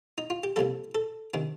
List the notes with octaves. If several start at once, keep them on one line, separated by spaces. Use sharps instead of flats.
D#4
F4
G4
C2 C3 G3 A#3 A4
A4
C3 D#3 D4